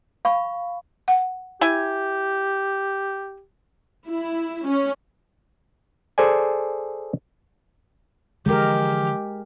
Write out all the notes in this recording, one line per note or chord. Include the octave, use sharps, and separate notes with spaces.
F5 B5 C#6
F#5
E4 G4 G#5
E4
C#4
G#4 A4 C5 D5 G#5
D3 E3 F3 G#3 G4 A#4